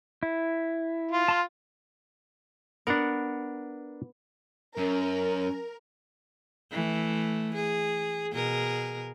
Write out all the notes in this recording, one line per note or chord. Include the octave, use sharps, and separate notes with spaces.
E4
F4
A5 C6 F6
B3 D4 A#4 F#5
F#2 C#4 A#4
E3 A3
G#4
B2 G#4 A#4